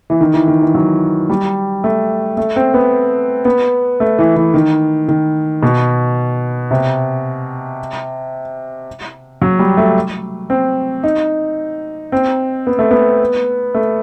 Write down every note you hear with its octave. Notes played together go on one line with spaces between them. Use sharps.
E3
D#3
E3
D#3
E3
F#3
G3
A3
A3
C4
B3
B3
A3
E3
E3
D#3
D#3
B2
C3
F#3
G3
A3
C4
D#4
C4
B3
A3
B3
A3